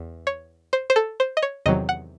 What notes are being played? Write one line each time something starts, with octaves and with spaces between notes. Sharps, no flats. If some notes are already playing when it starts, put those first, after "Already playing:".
Already playing: E2
C#5
C5
C5
A4
C5
D#5
C#5
E2 C3 D#3 F#3 D#5
F#5